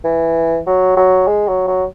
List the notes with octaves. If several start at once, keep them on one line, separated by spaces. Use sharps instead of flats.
E3
F#3
F#3
G#3
F#3
F#3